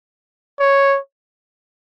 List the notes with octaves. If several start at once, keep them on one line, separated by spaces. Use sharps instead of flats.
C#5